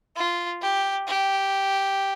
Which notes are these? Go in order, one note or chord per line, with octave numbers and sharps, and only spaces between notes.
F4
G4
G4